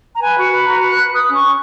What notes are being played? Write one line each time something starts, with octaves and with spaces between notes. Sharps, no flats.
A#5
B4 G#5
F#4
B4
F#4 A#5
B4
F#6
B4
B4 D#6
C#4
C#6
C#4